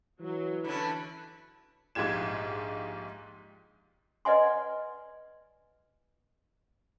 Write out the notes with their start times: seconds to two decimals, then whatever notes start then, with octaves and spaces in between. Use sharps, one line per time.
0.20 E3 F#3
0.64 D3 C#4 E4 B4
1.95 A#1 G#2 F4 G4 G#6 E7
4.25 B4 D5 D#5 F#5 G#5 C6